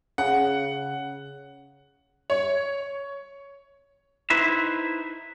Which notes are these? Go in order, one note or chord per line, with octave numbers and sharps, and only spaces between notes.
C#3 F#5
C#5
D#4 E4 B4 C5 E5